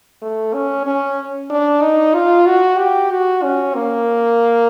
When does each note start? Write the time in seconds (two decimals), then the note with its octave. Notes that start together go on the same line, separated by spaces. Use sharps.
0.22 A3
0.54 C#4
0.86 C#4
1.50 D4
1.82 D#4
2.14 F4
2.46 F#4
2.79 G4
3.11 F#4
3.43 C#4
3.75 A#3